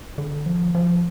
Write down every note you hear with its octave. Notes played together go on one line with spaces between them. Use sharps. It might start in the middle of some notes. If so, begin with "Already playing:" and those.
D3
F3
F3